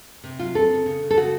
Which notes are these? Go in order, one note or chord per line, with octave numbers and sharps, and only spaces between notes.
C3
F#3 F4
C4 A4
C#3
C#3
C#3
A4
C#3 F#4